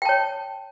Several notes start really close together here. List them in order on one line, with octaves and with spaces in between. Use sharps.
G5 A5 C#5